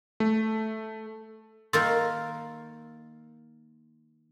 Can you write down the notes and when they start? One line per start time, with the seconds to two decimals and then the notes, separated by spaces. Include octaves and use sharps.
0.20 A3
1.73 D#3 A#3 A#4 C6 E6 A6